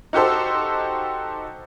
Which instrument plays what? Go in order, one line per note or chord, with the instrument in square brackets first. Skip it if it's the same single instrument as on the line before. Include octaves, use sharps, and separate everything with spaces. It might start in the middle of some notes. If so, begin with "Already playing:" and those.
[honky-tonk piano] D#4 F#4 G4 A4 C5